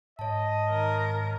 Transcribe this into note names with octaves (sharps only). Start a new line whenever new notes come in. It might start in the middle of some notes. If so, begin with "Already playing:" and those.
G#2 C#5 D#5 A5
D#3 A#4